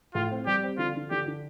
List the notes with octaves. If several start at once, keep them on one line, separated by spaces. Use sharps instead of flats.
A2 F4
C4
G3 G4
C4
D3 F4
D3
D3 G4
D3